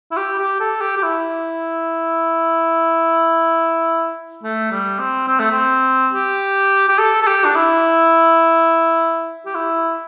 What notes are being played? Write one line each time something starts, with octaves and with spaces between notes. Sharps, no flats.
E4
G4
G4
A4
G4
G4
E4
A3
G3
C4
C4
A3
C4
G4
G4
A4
A4
G4
D4
E4
G4
E4